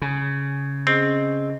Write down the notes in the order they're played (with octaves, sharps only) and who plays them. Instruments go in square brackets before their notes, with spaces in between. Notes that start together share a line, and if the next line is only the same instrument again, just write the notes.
[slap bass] C#3
[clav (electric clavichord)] C4 [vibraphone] C#4 G#4 D#5